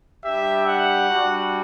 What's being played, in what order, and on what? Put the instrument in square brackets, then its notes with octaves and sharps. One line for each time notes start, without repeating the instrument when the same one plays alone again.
[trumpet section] G3 D4 G4 E5
F#5
G3 D4 F#4